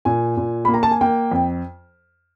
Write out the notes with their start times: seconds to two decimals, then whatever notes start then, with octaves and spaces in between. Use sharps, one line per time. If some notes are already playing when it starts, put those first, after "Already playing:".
0.05 A#2 G#5
0.37 A#2
0.65 A#3 B5
0.74 A#5
0.83 A5
0.91 G#5
1.01 A#3 G5
1.31 F2